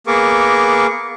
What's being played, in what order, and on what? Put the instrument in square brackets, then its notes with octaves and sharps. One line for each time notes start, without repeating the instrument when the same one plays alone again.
[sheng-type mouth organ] A#3 B3 G#4 A#4 C#6 D6